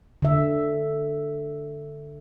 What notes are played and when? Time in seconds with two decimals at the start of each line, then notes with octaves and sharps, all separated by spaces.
0.22 D3 E5